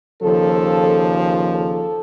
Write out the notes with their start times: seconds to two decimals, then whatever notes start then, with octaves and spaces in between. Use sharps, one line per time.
0.22 D#2 C#3 F3 A4
1.50 A4